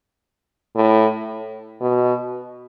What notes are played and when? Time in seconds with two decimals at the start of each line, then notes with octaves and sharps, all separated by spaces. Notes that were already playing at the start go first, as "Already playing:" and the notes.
0.76 A2
1.81 B2